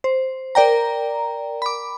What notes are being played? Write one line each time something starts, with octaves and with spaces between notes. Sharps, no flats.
C5
A#4 D5 G5 A#5
B5 D6